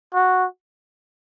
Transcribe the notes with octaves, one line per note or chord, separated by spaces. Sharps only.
F#4